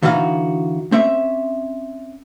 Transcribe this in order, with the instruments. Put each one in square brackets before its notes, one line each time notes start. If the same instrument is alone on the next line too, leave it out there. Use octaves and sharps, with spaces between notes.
[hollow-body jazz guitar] D3 E3 D#4 F#4 F5
C4 C#4 E5